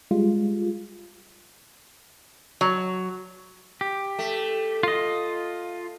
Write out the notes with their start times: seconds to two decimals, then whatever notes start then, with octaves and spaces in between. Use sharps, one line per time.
0.11 G3 G#3 F4
2.61 F#3
3.81 G4
4.19 A3
4.83 F4 D#5